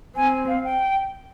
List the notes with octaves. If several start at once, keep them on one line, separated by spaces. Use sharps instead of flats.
C4 G#5
F5
G5